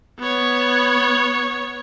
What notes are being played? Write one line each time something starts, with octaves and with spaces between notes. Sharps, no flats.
B3 C#5